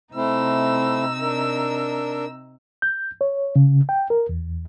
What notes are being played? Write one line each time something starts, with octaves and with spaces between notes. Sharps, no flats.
C3 A3 C4 D#4 E4 E6
D4 A#4
G6
C#5
C#3
G5
A#4
E2